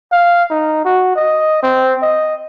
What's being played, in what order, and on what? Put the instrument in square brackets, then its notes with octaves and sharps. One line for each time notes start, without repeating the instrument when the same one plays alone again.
[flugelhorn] F5
D#4
F#4
D#5
C4
D#5